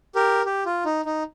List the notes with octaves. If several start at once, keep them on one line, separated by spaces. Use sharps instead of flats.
G4 A#4
G4
F4
D#4
D#4